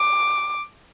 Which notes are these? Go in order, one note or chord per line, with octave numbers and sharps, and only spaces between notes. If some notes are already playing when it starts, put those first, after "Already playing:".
Already playing: D6